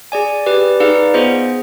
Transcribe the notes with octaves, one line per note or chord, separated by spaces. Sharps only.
G#4 D5 G#5
G4 B4 D5
D#4 G#4 B4 D5 F5
B3 F4 G#4 C5 D#5